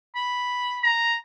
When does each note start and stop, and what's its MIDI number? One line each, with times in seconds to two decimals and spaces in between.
0.16 0.88 83
0.84 1.17 82